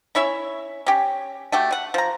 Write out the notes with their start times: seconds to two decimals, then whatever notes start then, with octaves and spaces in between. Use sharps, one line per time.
0.15 C#4 E4 C#5 E5
0.86 C#4 G4
1.52 A3 F#4 G4
1.72 F#5
1.94 F3 A#5